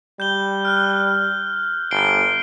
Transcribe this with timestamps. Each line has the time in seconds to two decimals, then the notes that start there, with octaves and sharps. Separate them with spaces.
0.20 G3 G6 G7
0.65 F6 F#6
1.91 G1 C7 D7 G7